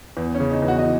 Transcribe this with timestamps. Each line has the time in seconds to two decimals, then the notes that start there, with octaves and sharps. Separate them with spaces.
0.17 E2
0.35 C#4
0.40 C#3
0.51 D#4
0.62 E2
0.68 F#4
0.79 D#5
0.84 E3